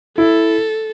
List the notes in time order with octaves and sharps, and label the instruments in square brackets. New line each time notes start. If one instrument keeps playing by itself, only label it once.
[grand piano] E4 [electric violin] A4